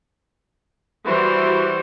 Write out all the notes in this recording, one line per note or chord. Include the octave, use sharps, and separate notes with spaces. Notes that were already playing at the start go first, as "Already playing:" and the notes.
E3 G3 F#4 C5